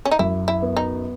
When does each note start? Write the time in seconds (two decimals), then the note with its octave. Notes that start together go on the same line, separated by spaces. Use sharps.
0.05 C#4
0.11 D#4
0.19 F#2 E4
0.48 E4
0.62 B3
0.77 D#4